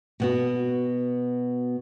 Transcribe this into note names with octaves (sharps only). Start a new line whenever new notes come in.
B2 B3 F#4